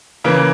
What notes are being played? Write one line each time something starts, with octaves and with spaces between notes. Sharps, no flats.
C#3 E3 A#3